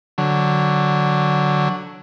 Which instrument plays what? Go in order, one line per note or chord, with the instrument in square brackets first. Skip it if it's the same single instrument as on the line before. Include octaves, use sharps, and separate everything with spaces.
[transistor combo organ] D3 F#3